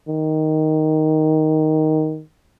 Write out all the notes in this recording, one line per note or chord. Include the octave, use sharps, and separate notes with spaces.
D#3